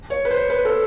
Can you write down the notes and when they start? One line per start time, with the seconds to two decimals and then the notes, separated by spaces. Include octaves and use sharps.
0.10 C#5
0.25 B4
0.31 C5
0.50 B4
0.65 A4